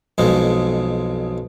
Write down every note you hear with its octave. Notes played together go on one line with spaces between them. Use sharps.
B1 F2 G#3